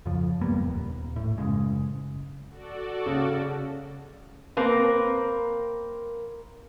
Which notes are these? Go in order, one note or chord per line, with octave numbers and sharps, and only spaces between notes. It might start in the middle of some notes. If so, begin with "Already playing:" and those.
F2 C#3 F3
G2 G3 A#3 B3
D#1
A2
F#1 D#2 C#3 G#3
F#4 A4 D5
C#3
A#3 C4 A#4 B4